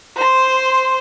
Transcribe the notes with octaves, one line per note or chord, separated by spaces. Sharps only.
C5 C6